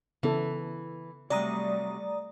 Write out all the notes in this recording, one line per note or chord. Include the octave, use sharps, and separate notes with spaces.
C#3 E3 B3 A4
C3 F#3 G3 A3 D5 A#5 D#6